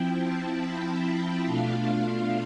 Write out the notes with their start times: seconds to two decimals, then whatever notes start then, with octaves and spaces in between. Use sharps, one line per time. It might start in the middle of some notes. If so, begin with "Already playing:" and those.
Already playing: F3 C4 E4 G5
0.19 A5
0.62 B5
1.04 A5
1.46 B2 A3 D4 F4 F5